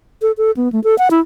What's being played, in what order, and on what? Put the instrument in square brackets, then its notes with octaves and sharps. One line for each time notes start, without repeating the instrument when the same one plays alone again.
[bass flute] A4
A4
B3
A3
A4
F#5
E4